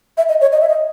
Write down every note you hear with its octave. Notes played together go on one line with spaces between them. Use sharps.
E5
D#5
C#5
D#5
E5
D#5